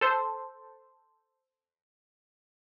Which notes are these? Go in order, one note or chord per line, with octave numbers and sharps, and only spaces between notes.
A4 C5